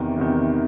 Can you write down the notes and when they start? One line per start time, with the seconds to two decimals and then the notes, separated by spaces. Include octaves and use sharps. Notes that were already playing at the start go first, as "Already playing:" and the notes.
Already playing: E2 C3 D#3
0.18 E2 C3 D#3